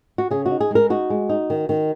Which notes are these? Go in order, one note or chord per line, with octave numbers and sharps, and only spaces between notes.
F#4
C#3 G#4
F#4
D#4
G#4
G#3 A#4
D#4 F#4
G#3
D#4
D#3
D#3